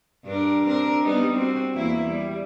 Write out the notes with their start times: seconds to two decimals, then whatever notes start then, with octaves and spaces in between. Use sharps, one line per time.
0.25 G2 D4 A#4
0.67 C4 D4 A#4
1.03 G3 B3 D#4
1.36 C4 F#4
1.74 E2 A#3 E4
2.07 G3